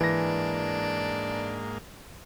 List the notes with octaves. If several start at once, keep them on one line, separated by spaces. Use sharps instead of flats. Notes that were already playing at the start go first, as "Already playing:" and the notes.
G#2 E3 A#3 D4 A#6